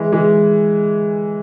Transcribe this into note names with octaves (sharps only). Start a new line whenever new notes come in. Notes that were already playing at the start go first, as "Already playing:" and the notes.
Already playing: E3 G#3
E3 G#3